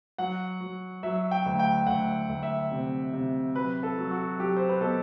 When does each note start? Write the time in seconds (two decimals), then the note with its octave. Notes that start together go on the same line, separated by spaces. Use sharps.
0.18 F#3 F#5
0.60 F#3
1.03 F#3 E5
1.31 G5
1.46 D2
1.59 G5
1.87 D2 F#5
2.29 D2
2.43 E5
2.72 C3
3.13 C3
3.55 F#3 B4
3.83 A4
3.98 F#3
4.11 F#4
4.39 F#3 G4
4.57 C5
4.69 B4
4.81 B2 A4